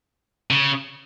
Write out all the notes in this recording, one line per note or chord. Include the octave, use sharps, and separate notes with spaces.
C#3